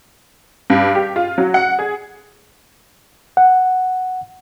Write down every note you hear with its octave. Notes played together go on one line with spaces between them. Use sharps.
G2
G4
F4
F#3
F#5
G#4
F#5